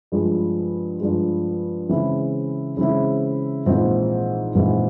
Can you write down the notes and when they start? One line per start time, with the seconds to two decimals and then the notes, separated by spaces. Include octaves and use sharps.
0.12 G2 F3 G#3
1.00 G2 F3 G#3
1.89 C#3 E3 G#3 C4 E4
2.77 C#3 E3 G#3 C4 E4
3.66 A#1 G#2 E3 G#3 C4
4.55 A#1 G#2 E3 G#3 C4